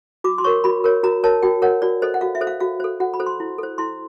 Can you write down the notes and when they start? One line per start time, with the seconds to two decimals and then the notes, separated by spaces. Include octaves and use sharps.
0.24 F#4 D6
0.38 C6
0.44 A#4 C#5 C#6
0.64 F#4 B5
0.84 A#4 C#5
1.03 F#4 A#5
1.24 A#4 C#5 A5
1.42 F#4 G5
1.62 A#4 C#5 F#5
1.82 F#4 D5
2.02 A4 C5 D#5
2.14 F#5
2.21 F#4 F5
2.35 E5
2.41 A4 C5
2.47 F5
2.60 F#4 F5
2.80 A4 C5
3.00 F#4 F#5
3.14 B5
3.20 A4 C5
3.26 C6
3.40 E4
3.58 A4 C5
3.78 E4 C6